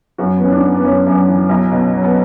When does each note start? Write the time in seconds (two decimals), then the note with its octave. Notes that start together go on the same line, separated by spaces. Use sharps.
0.18 F#2 F#4
0.37 B3
0.40 E3 C#4
0.52 D4
0.63 B3
0.75 B3
0.84 F#2 C#4
1.06 F#2
1.28 E3
1.49 B1
1.72 B2
1.93 F#3
2.04 B3